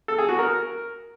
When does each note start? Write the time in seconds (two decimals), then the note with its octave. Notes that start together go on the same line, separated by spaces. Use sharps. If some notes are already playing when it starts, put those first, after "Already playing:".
0.08 A4
0.18 G#4
0.29 F#4
0.39 A#4